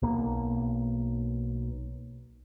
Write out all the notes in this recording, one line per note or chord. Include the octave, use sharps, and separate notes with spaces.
B1 A#3